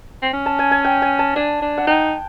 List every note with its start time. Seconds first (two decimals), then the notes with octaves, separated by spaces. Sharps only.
0.22 C4
0.33 C#4
0.46 A5
0.59 G#5
0.71 G#5
0.85 G5
1.02 G#5
1.19 A5
1.35 D4 G#5
1.62 D4
1.78 F#5
1.87 D#4 G5